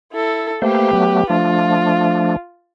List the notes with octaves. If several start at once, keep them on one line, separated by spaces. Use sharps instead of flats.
E4 A4
A3 A#3 G4 B4 C5
F#3 A3 B3
F3 A3 D4 F4